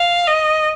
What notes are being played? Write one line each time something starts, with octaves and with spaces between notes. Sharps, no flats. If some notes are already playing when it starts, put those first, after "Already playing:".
Already playing: F5
D#5